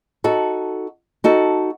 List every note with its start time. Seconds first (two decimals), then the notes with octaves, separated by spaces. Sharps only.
0.24 D#4 F#4 A4
1.24 D#4 F#4 A4